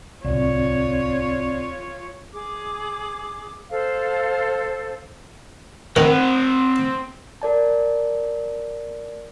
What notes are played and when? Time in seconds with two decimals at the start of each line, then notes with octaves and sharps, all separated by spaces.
0.24 D1 C2 C4 F4 C#5 D5
2.34 G#4 D6
3.70 A4 C5 F5
5.96 D#3 C4 D#4 F#5
7.42 A#4 D5 A5